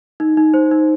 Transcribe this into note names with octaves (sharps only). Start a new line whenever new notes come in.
D#4
D#4
C5
D#4